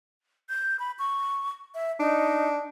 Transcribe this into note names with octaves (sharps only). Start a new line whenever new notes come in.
G6
B5
C#6
E5
D4 D#4